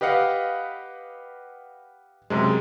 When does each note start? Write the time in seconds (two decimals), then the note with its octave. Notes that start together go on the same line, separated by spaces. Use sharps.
0.01 G4 B4 D#5 F5 F#5
2.30 F#2 C3 G#3